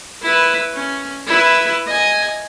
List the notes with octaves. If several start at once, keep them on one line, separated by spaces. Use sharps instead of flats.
E4 B4
C#4
E4 B4
D#5 G#5